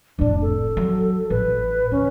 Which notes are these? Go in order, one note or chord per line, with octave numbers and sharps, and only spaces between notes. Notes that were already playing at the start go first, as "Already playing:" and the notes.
F1 A2 D4
A4
F#3
A1 B4
D2 C#4